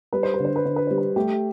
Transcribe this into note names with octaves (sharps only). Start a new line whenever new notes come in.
G3 B4
C5
B4
D3
C5
B4
D3 C5
B4
G3 C5
B4
A3 G4